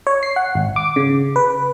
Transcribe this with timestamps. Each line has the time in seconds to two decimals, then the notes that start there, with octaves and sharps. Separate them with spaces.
0.07 C#5
0.23 C7
0.36 F#5
0.55 G#1
0.76 D6
0.96 C#3
1.36 B4